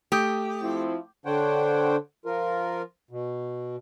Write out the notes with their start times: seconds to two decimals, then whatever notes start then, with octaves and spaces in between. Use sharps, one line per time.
0.12 A3 G4 D#6 G6
0.60 F3 C4 E4
1.26 D3 D4 C5 C#5 F#5 G5
2.25 F3 F4 A#4
3.11 B2